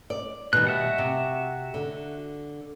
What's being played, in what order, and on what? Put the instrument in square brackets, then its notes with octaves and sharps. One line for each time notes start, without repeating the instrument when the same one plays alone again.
[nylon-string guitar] D5
[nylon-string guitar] B2 G3 [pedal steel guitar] D#3 F#6
[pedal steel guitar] F#4 E5 F#5
[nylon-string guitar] C3
D3